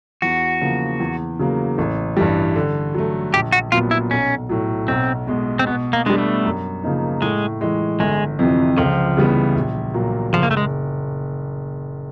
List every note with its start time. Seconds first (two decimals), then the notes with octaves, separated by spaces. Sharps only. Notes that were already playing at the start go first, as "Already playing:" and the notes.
0.22 E2 F#4
0.61 C#3 F3 A#3
1.00 E2
1.39 C#3 F#3 A#3
1.78 A1
2.17 G2 E3 G3
2.55 D3
2.95 F#3 A3
3.33 A#1 G4
3.52 F#4
3.72 A#2 F#3 B3 F4
3.91 E4
4.11 B1 C#4
4.49 A2 F#3
4.88 B1 C4
5.27 B2 G#3
5.59 C4
5.67 B2 B3
5.93 A#3
6.06 G3 G#3 B3 D4
6.18 A3
6.45 F#2
6.83 C#3 F3 A#3 D#4
7.22 A2 G#3
7.61 E3 G#3
8.00 G1 G#3
8.39 F2 C3 E3
8.77 C#2 F3
9.17 C#3 E3 G3 B3
9.55 A#1
9.94 A#2 F#3 A#3
10.33 F#1 F3
10.43 A#3
10.51 A3
10.57 G#3